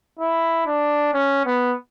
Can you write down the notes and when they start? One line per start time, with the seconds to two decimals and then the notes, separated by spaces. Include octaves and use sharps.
0.19 E4
0.67 D4
1.14 C#4
1.46 B3